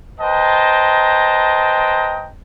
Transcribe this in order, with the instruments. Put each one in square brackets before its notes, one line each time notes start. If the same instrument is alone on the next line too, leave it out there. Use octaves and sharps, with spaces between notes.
[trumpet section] B4 C5 D#5 G5 A5 A#5